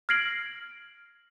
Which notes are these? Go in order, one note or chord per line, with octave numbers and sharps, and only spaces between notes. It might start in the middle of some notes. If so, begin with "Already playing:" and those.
F6 G#6 A#6 C7 D7 F#7